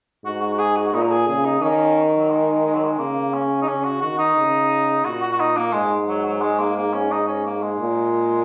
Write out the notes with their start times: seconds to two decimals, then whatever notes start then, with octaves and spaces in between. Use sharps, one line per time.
0.24 G#2 F#4
0.43 F#4
0.53 F#4
0.59 G#4
0.77 F#4
0.87 F#4
0.93 A#2 D#4
1.03 A#4
1.11 G#4
1.28 C#3 G#4
1.45 D#4
1.61 D#3 C#4
2.18 F#3
2.30 G#3
2.65 G#3
2.75 F#3
2.85 G#3
2.99 C#3 A#3
3.34 C#4
3.62 D#4
3.67 C#3 C#4
3.84 F#4
4.02 D#3 F#4
4.19 D#4
4.37 C#3
5.05 A#2 F#4
5.22 F#4
5.33 F#4
5.40 D#4
5.57 A#3
5.73 G#2 G#3
6.08 F#3
6.25 F#3
6.42 G#3
6.59 A#3
6.77 A#3
6.94 C#4
7.11 D#4
7.27 C#4
7.45 A#3
7.62 G#3
7.79 A#2